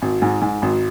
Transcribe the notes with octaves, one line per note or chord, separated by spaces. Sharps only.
G#1
G#2
G#2
G#1